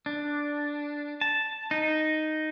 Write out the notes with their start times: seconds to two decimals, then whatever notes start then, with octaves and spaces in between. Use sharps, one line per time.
0.06 D4
1.21 A5
1.71 D#4